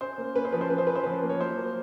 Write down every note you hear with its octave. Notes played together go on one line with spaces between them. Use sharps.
C#4 C5
A#3
C#4 B4
C5
F3 B4
C5
C#4 B4
C5
C#4 B4
C5
F3 B4
A#3
C#5
F#3 C5
A#3